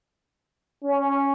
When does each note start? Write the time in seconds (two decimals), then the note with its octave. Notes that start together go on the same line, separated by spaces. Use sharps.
0.83 C#4